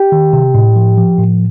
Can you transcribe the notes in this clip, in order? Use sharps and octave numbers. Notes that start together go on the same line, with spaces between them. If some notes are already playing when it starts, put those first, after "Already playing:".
Already playing: G4 G5
D#3
C3
A2
F3
F3
A2